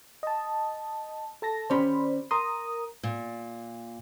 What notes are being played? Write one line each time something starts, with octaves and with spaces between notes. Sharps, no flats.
D#5 A5
A4 A5 A#6
D#3 C#4 G4 C5 D5 B5
A#4 A#5 C6 D#6
A#2